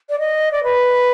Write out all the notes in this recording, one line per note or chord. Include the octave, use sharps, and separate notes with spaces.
D5
D#5
D5
B4